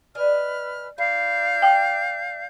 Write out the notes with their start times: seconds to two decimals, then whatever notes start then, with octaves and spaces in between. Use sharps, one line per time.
0.15 B4 D5 D#5 G#5 F6
0.98 E4 D5 F5 G6
1.62 G5